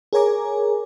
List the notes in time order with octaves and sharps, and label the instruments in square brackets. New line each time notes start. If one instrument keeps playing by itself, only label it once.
[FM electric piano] G#4 A#4 C#5 G#5 A#5 D6